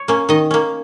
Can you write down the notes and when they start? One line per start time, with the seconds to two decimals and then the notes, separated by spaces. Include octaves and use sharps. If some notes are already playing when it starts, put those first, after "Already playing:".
Already playing: C#5
0.08 A#3 C#4
0.29 D#3 D#5
0.51 A#3 C#4